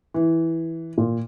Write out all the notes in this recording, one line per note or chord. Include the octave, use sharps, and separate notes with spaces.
E3
A#2